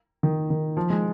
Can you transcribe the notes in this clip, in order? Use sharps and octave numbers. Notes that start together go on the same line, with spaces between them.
D#3
D#3
F3
G#3